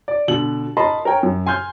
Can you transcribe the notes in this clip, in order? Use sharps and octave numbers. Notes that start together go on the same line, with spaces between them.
D5
B2 D3 F#7
A#4 D#5 A5 B5 C6
A#4 C#5 G5 G#5
F#2
G#5 C6 F6 G6